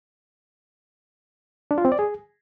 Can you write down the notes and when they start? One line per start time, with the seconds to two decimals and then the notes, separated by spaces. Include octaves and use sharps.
1.71 D4
1.78 F4
1.85 C4
1.92 D5
1.99 G#4